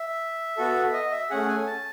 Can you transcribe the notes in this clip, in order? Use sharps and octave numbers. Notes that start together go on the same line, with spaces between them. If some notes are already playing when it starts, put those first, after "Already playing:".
Already playing: E5
B3 F#4 A4
D#5
E5
A3 C#4 G#4 F#5
G#5
A5